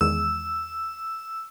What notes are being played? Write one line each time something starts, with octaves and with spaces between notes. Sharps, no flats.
E2 D#3 G#3 E6